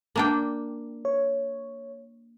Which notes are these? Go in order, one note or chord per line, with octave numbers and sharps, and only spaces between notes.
A#3 D4 G5
C#5